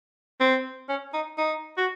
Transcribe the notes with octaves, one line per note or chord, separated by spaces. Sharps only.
C4
C#4
D#4
D#4
F#4